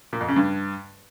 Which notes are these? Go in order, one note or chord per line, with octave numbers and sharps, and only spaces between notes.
A#2
F2
C#3
G2